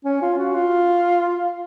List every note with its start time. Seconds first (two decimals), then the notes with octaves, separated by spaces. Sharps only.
0.05 C#4
0.22 F4
0.38 F#4
0.55 F4